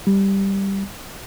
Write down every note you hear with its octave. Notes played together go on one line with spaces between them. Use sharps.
G3